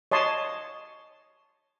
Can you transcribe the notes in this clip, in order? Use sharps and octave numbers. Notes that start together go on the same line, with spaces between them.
C#5 D#5 A5 C6